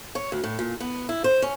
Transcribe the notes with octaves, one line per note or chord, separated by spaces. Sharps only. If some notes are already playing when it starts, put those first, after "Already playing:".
C#5
D2
A2
A#2
B3
E4
C5
C#4